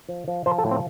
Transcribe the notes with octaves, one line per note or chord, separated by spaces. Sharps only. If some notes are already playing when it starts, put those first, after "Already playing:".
F3
F3
F3 C5
A4
A2
C4